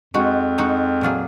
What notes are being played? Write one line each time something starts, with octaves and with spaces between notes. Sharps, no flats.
F2 G#3 D#4 F#4
G#3 D#4 F#4
A#2 F#3 A#3 F4 G#4